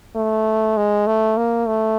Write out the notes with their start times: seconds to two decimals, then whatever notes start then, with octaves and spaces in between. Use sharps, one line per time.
0.15 A3
0.77 G#3
1.07 A3
1.37 A#3
1.67 A3